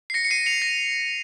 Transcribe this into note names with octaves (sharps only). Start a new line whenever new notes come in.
C7
A#6 C#7
C#7
C7 D#7
C#7 F7
A#6